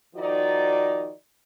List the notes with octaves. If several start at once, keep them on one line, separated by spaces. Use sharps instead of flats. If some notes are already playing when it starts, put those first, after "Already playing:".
D#3 F3 D#4 F#4 D5